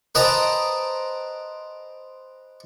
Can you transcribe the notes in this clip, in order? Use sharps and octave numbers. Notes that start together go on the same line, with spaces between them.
B4 C5 D#5 G5 A5 A#5